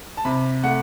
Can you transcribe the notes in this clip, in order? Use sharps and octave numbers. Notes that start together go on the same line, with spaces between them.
A5
C3 B5
A3 F#5